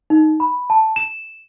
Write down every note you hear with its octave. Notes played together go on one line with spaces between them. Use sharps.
D#4
B5
A5
E7